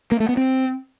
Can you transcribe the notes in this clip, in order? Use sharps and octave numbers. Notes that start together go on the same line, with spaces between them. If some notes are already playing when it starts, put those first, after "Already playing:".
A#3
A3
B3
C4